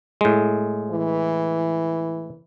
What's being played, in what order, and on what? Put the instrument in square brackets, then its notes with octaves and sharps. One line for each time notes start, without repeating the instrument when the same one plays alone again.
[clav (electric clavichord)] A2 G#3
[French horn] E3